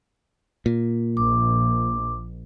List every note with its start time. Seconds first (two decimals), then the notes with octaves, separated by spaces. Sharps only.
0.66 A#2
1.17 A#1 D6